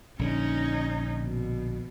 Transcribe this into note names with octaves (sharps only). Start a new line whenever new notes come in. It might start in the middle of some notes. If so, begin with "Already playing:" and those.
A#1 D3 C#4 D#4
B2